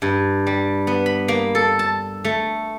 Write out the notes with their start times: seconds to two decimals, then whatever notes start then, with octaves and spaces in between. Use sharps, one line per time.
0.02 G2
0.47 G3
0.87 B3
1.06 B5
1.28 A#3
1.55 A4
1.79 A5
2.24 A3